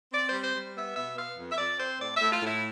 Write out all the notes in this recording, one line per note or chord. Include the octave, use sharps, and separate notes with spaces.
C4 D5
G3 C5
C5
G3
B3 E5
B2 E5
B3 F5
F2
E5
F2 D5
C4 C5
A2 D5
A2 E5
F4
A2
E4